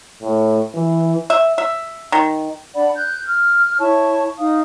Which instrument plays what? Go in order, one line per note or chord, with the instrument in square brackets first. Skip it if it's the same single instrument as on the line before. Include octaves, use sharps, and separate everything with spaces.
[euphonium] A2
E3
[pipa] E5
E5
D#3
[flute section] D4 D5 F#5 B5
F#6 G6
F6
E4 C#5 A5 C#6
D#4 F5 D#6